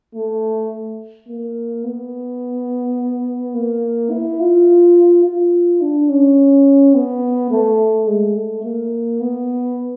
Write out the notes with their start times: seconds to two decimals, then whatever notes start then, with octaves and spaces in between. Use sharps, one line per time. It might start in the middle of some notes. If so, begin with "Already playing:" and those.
0.15 A3
1.28 A#3
1.84 B3
3.54 A#3
4.11 E4
4.40 F4
5.24 F4
5.81 D4
6.09 C#4
6.95 B3
7.51 A3
8.07 G#3
8.36 A3
8.64 A#3
9.21 B3